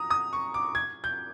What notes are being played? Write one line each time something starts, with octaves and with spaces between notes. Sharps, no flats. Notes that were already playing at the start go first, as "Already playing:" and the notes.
Already playing: A#5 D#6
D#6
C#6
D6
G#6
G6